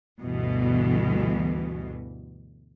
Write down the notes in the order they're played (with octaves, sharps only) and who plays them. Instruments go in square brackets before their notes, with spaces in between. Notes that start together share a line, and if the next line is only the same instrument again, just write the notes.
[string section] D2 G2 B2 E3